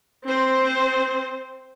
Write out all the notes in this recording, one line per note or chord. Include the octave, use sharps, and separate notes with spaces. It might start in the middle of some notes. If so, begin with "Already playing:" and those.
C4 C5